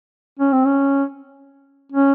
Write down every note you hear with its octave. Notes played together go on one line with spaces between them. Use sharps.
C#4
C4
C#4
C#4